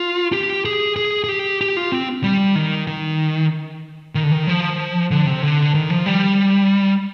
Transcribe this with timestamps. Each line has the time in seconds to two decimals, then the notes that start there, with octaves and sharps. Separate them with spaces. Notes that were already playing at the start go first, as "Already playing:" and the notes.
Already playing: F4
0.33 G4
0.65 G#4
0.96 G#4
1.24 G#4
1.29 G4
1.61 G4
1.77 F4
1.92 C4
2.23 G3
2.55 D#3
2.87 D#3
4.15 D#3
4.23 D3
4.32 D#3
4.47 F3
5.11 D3
5.26 C3
5.42 D3
5.75 D#3
5.90 F3
6.06 G3